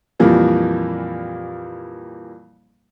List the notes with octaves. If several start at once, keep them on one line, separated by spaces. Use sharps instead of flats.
F2 A#2 E3 G3 A#3